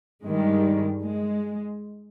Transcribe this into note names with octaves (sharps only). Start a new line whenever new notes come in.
G2 D#3 G3 G#3
G#3